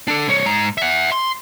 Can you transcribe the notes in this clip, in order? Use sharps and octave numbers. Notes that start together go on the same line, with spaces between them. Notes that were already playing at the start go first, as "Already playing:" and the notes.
D4 A4
C2 C#5
G#2 A#5
E5 F#5
C6